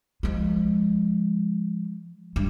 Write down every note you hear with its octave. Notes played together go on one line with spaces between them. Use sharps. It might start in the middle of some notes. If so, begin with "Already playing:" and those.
F3 G#3
G2